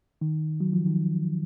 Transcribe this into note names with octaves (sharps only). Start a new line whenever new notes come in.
D#3
F#3
F3
D#3